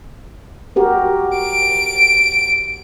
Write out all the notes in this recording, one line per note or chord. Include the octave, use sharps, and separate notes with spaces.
F#4 G4 A#4
D7